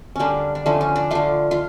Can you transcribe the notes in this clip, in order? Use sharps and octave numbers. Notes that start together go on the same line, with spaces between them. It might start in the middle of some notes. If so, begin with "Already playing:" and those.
D3 G3 A#3 C#4 D4
D4
D3 F3 A3 C#4
C#4
D4
D3 A3 F4
F4